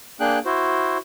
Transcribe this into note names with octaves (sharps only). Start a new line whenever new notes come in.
A#3 D4 G#4 G5 F#6
E4 F#4 C5